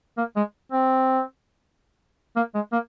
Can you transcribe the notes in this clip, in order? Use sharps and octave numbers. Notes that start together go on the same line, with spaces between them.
A#3
G#3
C4
A#3
G#3
A#3